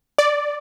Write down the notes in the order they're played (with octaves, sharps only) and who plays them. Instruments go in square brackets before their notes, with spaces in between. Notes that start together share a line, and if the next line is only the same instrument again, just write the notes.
[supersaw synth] D5